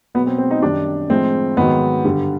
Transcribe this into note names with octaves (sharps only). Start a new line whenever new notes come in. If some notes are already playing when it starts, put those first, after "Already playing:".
B2 F#3 B3
C4
C4
D#4
F#2 D#3 G3 D4
A2 F3 G#3 C4
G#2 D#3 F#3 B3
G2 D3 G3